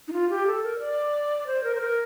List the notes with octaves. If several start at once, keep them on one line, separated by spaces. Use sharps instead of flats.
D#4
F4
G4
A4
A#4
D5
C5
A#4
C5
A#4